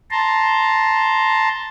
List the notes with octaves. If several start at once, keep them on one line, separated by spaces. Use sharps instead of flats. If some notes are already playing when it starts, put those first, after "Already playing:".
A5 A#5 C6